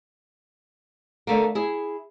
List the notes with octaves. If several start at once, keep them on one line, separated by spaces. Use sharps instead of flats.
D3 A3 A#3
E4 G#4